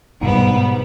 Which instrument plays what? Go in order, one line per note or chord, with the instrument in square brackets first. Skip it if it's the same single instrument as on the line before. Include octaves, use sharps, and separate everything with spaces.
[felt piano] G#2 [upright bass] B2 [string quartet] G3 B3